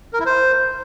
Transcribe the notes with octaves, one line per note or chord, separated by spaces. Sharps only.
A#4
E4
C5